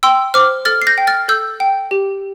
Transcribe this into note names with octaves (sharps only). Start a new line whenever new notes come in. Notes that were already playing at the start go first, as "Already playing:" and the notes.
G5 C6 E6
C5 D6 F6
A4 F6 A6
C7
G6 A#6
G5
F6 A6
A4 E6 G6
G5
G4